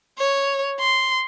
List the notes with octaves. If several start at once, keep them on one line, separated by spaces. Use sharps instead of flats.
C#5
C6